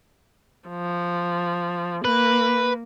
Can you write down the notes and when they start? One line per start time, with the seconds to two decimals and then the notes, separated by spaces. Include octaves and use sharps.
0.69 F3
2.05 A#3 B4